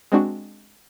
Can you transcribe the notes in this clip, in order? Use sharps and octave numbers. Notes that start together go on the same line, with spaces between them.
G#3 C4 D4 F#4